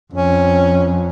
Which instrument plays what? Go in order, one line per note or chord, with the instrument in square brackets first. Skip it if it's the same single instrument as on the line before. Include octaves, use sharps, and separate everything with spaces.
[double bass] F2 [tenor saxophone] C#4